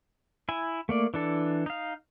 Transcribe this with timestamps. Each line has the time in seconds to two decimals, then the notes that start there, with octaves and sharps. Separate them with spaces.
0.49 E4 G#5
0.89 A3 A#3 D5
1.14 E3 D4 A4
1.66 D#4 F5